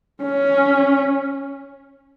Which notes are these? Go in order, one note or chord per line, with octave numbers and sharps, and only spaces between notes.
C#4